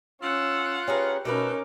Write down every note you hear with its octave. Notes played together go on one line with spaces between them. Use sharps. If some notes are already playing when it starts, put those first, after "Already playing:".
C#4 F4 F#5 E6
C#4 G4 G#4 A#4 B4
B2 A3 C#4 D#4 A#4 B4 D6